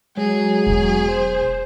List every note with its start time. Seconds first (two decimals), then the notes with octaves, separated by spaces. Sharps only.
0.17 F#3 G#3 G#4
0.67 E1
1.08 C5